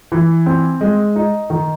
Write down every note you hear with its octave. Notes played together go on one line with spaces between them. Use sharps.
E3
C4
G#3
D#4
D#3